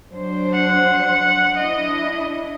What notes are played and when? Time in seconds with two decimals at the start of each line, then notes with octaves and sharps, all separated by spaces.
0.11 F#3 D4 C5
0.54 F#5
1.57 D4 E4 D#5